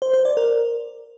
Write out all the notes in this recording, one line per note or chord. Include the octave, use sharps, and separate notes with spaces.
C5
C5
D5
A#4